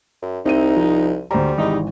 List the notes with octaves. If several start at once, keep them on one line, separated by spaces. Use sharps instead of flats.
F#2
C2 C4 D#4 E5 D#7
F3
D2 G3 C5 A#5
G#1 G#2 C3 E3 D#4